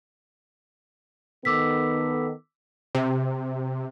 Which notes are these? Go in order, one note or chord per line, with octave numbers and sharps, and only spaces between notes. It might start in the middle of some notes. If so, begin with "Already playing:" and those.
D#3 B3 A4 D6 E6 B6
C3